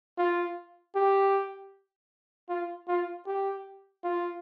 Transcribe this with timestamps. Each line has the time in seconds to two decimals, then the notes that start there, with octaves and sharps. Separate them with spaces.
0.18 F4
0.96 G4
2.49 F4
2.88 F4
3.27 G4
4.04 F4